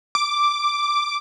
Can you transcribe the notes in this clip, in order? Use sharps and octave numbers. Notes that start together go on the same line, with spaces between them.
D6